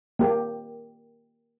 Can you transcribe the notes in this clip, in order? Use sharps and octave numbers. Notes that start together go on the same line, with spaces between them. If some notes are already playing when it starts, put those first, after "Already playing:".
A#3 G4